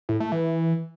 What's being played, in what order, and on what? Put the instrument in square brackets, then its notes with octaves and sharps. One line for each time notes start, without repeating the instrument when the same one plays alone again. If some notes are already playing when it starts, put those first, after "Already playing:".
[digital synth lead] A2
A3
E3